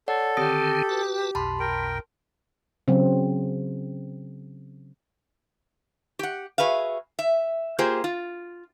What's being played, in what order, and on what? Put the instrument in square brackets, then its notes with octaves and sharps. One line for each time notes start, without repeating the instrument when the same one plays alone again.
[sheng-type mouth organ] A4 [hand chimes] C#5 D5 F#5
[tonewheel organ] D3 D#3 C4 [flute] G4 [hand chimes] D#6
[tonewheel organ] F#4 B4 A5
[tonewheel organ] B1 F2 B2 [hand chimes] A5 B5 C6
[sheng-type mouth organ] A#4 G5
[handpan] C#3 F#3 C4
[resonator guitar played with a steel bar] G4 F#5
F#4 G#4 B4 E5 F5
E5
A#3 F4 G4 G#4 C5
F4